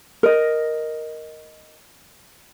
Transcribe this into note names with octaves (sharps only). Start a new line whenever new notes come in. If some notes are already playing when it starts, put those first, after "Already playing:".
A#4 D#5